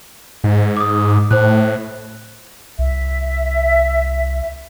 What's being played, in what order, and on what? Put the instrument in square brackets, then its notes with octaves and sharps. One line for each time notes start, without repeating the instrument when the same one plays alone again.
[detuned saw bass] G#2
[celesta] D6 D#6
[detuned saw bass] A2 [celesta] C5 F#6
[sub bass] C2 [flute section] E5